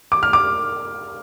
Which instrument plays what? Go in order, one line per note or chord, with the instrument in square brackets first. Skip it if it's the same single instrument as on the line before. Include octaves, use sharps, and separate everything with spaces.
[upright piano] D6
F6
D6